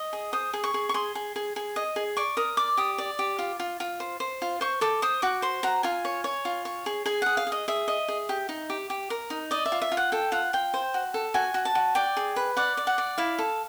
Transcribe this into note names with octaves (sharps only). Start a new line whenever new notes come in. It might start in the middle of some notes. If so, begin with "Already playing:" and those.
Already playing: D#5
G#4
C5 D#6
G#4
C#6
G#4
C#6
G#4 C6
G#4
G#4
G#4
D#5
G#4
D5 C#6
A#4 D#6
D5 D6
G4 D#6
D5
G4
F4
F4
F4
C5
C5
F4
C5 C#6
A4 D6
C5 D#6
F#4 D6
C5 C6
F#4 A#5
F4 G#5
C#5
C#5
F4
C#5
G#4
G#4 G#5
G#4 F#5
F5
G#4
D#5
G#4 E5
D#5
G#4
G4
D#4
G4
G4
A#4
D#4
D5 D#5
E5
F4
E5
F4
F#5
A4 G5
F4 F#5
F4 G5
C5
F#4
A4
F#4 G#5
F#4
A5
F#4
D5 G5
G#4
B4
D5 F#5
D5
F#5
D5
E4 F5
A4